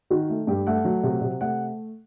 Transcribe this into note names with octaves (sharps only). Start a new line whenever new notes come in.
D#3 F#4
A3
G2 G4
A3 F#5
F#3
C3
C3
A3 F#5